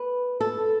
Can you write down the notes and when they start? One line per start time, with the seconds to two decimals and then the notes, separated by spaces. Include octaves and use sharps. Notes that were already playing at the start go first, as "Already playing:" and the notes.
Already playing: B4
0.40 A4